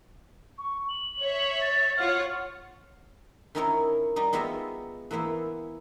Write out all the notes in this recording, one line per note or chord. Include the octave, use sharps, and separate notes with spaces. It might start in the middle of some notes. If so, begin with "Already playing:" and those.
C#6
F#7
C#5 E5
A6
F4 C#5 F#5 F6
D#3 C#4 D#4 E4 A#4 C#5
G3 D#4 D5
G#3 B3 F4 G4 E5 A#5
E3 A#3 B3 E4 C5